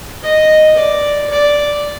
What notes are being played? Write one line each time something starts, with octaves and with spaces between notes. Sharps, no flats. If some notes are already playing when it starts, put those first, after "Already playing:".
D#5
D5
D5